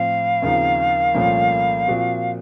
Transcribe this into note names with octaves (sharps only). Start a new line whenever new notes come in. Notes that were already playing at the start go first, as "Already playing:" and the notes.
Already playing: A2 F3 C4 F5
D#2 C#3 F3 C4 D#4
C2 A#2 F3 A3 C#4
A#2 F3 C4 F#4